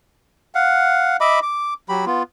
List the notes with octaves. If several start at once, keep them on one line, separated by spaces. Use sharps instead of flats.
F5 F#5
D#5 E5 B5 D6
D6
F#3 G4 B5
B3 F4